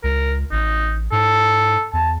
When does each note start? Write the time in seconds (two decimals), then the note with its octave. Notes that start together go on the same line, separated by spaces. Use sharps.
0.04 C#2 A#4
0.51 A1 D#4
1.12 G#2 A4
1.93 E2 A5